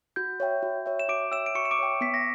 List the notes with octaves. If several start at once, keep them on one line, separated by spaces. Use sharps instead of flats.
F#4 G6
C#5 E5 G5
F#4
C#5 E5 G5
E7
F#4 D6 D7
C#5 E5 G5 E6 E7
D7
F#4 C#6 C#7
E7
D6 D7
C#5 E5 G5
B3 B6
A#6